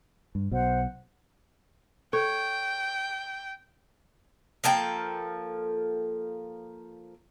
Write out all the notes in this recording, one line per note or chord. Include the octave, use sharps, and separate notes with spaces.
G2
B1 B2 C5 F#5
A4 C#5 G5
F3 A#3 A4 G5